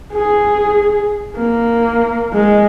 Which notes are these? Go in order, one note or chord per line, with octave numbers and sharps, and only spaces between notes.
G#4
A#3
G#3